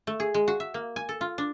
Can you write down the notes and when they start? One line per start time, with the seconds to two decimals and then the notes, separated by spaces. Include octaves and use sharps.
0.07 A3
0.20 G#4
0.34 G#3
0.48 F#4
0.60 E5
0.74 A#3
0.96 G#5
1.09 A4
1.21 F4
1.38 D4